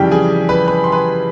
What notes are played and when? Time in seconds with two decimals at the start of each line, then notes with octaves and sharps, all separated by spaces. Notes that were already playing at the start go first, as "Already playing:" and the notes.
Already playing: F2 C#3 E3 G3 G4 G5
0.11 G#4 G#5
0.49 B4 B5
0.67 B4 B5
0.84 C6
0.92 B4 B5